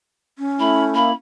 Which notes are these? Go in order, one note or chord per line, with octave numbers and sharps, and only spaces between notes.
C#4
A3 E4 B5
A#3 E4 B5